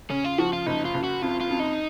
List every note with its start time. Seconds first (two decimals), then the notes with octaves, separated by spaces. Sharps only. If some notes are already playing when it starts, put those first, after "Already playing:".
0.10 C#3 C#4
0.24 F4
0.38 F3 F#4
0.53 F4
0.66 F#1 D#4
0.85 F4
0.94 F#1
1.04 F#4
1.22 F2 F4
1.41 F4
1.50 F2
1.60 D#4